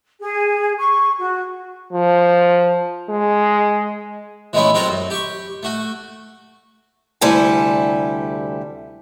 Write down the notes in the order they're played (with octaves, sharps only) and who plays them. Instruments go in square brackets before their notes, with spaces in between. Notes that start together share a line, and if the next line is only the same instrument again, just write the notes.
[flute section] G#4
C#6
F#4
[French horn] F3
G#3
[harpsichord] E3 G#3 A3 B3 C#4 E4
F#3 G#3 C4 F4 A4 A#4
F#2
G4 C#6
A3 F#4
[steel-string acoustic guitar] D2 C3 G3 E4 A4 G#5